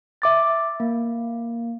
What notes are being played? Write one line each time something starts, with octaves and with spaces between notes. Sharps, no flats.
E5 D6 A6
A#3